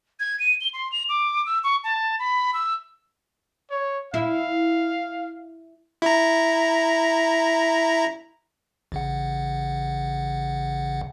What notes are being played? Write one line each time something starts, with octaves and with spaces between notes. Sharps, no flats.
G#6
D#7
G7
C6
F7
D6
E6
C#6
A5
B5
E6
C#5
E4 F5
E4 A#5
A1 C#3 F#5